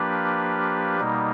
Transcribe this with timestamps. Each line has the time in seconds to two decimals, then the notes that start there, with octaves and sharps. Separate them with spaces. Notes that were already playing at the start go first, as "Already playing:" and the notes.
Already playing: F3 A#3 D4 G4 B4
1.00 B2 G3 A#3 D#4